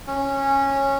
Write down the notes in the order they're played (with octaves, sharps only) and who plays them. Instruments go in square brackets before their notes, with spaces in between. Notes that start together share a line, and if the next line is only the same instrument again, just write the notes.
[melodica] C#4